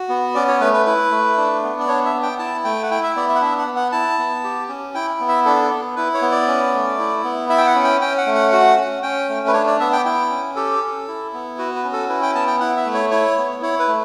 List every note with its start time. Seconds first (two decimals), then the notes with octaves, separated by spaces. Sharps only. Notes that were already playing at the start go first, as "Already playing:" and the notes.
Already playing: F#4
0.09 B3
0.35 C#4 D5
0.48 C#5
0.61 A3 B4
0.74 B4
0.86 E4 B4
1.12 A3
1.37 D4
1.63 B3
1.80 D5
1.88 D4 C#5
2.06 E5
2.14 B3
2.23 G5
2.39 E4 A5
2.64 A3 G5
2.83 F#5
2.91 E4 G5
3.03 E5
3.16 B3 D5
3.29 E5
3.35 F#5
3.41 D4 E5
3.58 F#5
3.67 B3
3.76 F#5
3.92 E4 A5
4.18 B3
4.44 G4
4.69 C#4
4.95 E4 G5
5.20 B3
5.28 E5
5.45 D4 A4
5.71 B3
5.96 E4 B4
6.14 C#5
6.22 B3
6.31 D5
6.48 C#4
6.74 A3
6.99 E4
7.24 B3
7.49 E4 E5
7.58 G5
7.67 F#5
7.75 C#4
7.84 G5
8.01 C#4 G5
8.18 F#5
8.26 A3
8.35 F#5
8.52 F#4 F#5
8.77 C#4
9.03 C#4 G5
9.29 A3
9.48 B4
9.54 D4 C#5
9.67 D5
9.80 B3 E5
9.93 G5
10.05 E4 G5
10.30 C#4
10.56 G4 A4
10.82 C#4
11.08 E4
11.33 B3
11.58 F#4 B4
11.75 B4
11.84 C#4
11.93 A4
12.09 E4 B4
12.22 G5
12.35 B3 A5
12.47 G5
12.60 E4 F#5
12.77 E5
12.85 A3
12.94 C#5
13.11 E4 C#5
13.37 B3
13.62 E4 C#5
13.79 B4
13.88 A3